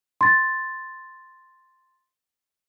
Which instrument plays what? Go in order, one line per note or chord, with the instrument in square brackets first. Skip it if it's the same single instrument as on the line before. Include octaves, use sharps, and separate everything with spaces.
[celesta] C6 A6